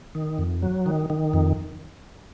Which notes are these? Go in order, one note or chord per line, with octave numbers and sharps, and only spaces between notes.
D#3
F2
F#3
D#3
D#3
F2